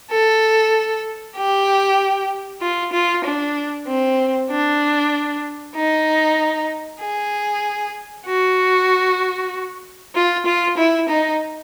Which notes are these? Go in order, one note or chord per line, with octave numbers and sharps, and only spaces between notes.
A4
G4
F4
F4
D4
C4
D4
D#4
G#4
F#4
F4
F4
E4
D#4